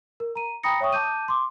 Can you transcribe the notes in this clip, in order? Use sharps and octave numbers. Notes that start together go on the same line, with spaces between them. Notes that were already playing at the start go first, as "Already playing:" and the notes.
A#4
A#5 D#7
G5 A#5 B5 D#6 A#6 C#7
C#5 E5 G5 C#6 D#6
A5 D6 G6 D#7
C6 D6